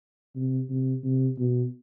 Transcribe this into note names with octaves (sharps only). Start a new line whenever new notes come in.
C3
C3
C3
B2